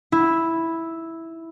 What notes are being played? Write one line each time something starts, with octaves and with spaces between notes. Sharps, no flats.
E4